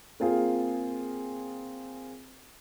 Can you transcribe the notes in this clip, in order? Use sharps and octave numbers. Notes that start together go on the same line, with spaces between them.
A#3 C4 F4 G#4